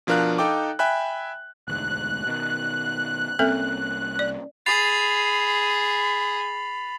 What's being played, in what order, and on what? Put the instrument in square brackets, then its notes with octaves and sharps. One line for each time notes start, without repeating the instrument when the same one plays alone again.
[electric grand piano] B2 F3 D4 A#4 F5 F#6
D#4 A4 F5 G5 D6
E5 G5 G#5 B5 F#6
[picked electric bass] E1 D2 G#2 [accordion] F#6
[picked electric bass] B2 D#3
[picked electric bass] C2 A#3 C#4 [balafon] C4 A4 E5
[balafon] D5
[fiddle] G#4 [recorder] B5 [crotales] A6 C7 F7